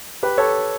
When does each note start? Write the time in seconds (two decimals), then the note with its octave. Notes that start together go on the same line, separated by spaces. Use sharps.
0.23 G4 B4
0.38 A4 C#5